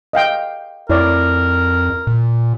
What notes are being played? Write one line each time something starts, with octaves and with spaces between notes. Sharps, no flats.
D#5 F5 G5
F2 E4 A#4 C#5 D5
A#2